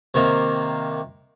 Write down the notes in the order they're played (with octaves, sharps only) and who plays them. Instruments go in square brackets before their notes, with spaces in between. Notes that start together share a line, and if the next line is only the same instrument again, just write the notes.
[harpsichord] C3 D#3 A#3